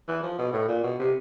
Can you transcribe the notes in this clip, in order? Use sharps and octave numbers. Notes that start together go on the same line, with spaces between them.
E3
F3
B2
A2
A#2
B2
C3